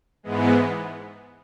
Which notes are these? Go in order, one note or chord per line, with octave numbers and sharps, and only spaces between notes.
G#2 E3 G#3 B3